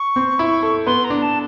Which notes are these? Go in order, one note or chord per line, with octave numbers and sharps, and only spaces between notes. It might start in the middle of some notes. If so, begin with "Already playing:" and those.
Already playing: C#6
C4
E4
A4
B3 C6
A#5
D4
A5